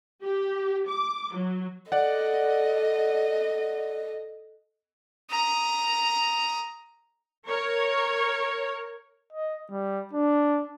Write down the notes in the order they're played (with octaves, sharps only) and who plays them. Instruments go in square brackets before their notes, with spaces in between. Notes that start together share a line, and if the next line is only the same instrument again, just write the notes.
[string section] G4
D6
F#3
[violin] A4 D#5 [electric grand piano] D5 F#5
[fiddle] A#5 D#6
[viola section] A#4 C#5
[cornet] D#5
G3
D4